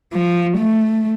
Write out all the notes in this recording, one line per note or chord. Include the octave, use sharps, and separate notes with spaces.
F3
A3